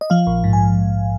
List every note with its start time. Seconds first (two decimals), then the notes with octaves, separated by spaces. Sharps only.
0.01 D#5
0.10 F3 F5
0.27 A#1
0.44 G#2
0.53 G#5